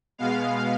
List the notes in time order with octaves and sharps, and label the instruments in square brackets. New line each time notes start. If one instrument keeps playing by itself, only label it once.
[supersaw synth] B2 G#3 B3 F5